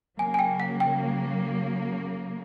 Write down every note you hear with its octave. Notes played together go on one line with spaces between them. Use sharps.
C#3 F#3 A#3 G#5
G#5
G5
F#5
G5